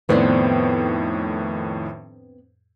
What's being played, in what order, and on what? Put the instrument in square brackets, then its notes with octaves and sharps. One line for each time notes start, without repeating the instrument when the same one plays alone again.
[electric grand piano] F2 A2 D#3 [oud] B3 C4 D4